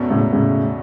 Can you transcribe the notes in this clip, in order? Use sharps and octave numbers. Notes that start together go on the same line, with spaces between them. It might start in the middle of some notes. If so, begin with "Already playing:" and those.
Already playing: E1 E2 B2 A3 C#4
A2 C#3
A2 C#3